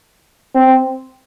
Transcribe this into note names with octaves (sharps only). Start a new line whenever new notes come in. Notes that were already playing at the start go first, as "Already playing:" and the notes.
C4